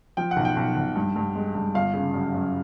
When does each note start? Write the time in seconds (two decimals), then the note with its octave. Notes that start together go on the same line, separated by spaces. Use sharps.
0.17 F3 G5
0.31 F#5
0.36 B1
0.45 G5
0.57 B1
0.76 B1
0.96 G2
1.16 G2
1.35 G#3
1.55 G2
1.74 G1 F5
1.94 C#3
2.14 F#2
2.34 F#2